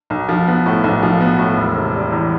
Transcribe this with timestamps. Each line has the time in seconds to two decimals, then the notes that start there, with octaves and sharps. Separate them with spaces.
0.10 B1
0.29 F3
0.47 B3
0.66 A2
0.84 B1
1.02 F3
1.21 B3
1.39 A2
1.57 E1
1.76 C3
1.94 G3
2.12 E2